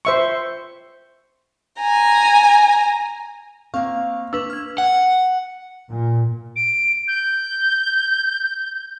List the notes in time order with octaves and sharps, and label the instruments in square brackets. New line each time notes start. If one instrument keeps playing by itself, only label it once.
[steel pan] C5 E5 C#6
[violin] G#5 A#5
[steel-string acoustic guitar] A#3 F5 [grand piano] C4 [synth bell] C#6
[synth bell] D4 B4 C#6 [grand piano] E6
[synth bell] F6 G#6
[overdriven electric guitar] F#5
[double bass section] A#2
[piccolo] D7
G6